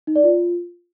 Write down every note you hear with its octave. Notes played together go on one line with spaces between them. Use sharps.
D#4
D5
F4